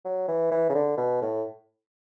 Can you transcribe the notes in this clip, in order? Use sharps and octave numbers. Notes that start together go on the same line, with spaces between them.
F#3
E3
E3
C#3
D3
B2
A2